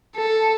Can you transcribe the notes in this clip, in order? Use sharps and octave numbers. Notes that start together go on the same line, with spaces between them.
A4